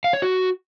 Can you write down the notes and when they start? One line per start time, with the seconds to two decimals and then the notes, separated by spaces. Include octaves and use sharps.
0.04 F5
0.13 C#5
0.22 F#4